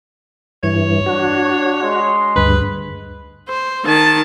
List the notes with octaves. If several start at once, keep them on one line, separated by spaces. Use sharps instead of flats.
G2 E3 C#5
D4 F#4
G#3 D#5 C6
D2 G2 B4
C5
D#3 A5